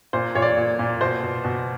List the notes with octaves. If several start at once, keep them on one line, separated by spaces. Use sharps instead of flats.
A#2 C5
A#2 C#5
D5
A#2
A#2
B2 C5
B2
B2